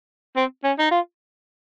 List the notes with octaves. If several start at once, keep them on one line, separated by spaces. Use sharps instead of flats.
C4
C#4
D#4
F4